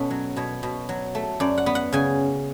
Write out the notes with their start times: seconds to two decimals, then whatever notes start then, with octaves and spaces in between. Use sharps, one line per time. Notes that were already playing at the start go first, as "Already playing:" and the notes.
Already playing: B2 B3 C#4 A4
0.10 F#3
0.36 B2 C#5
0.63 B2
0.89 F#3
1.15 A3
1.40 F#2 D5
1.58 F#5
1.66 B3
1.75 F#5
1.93 C#3 G#5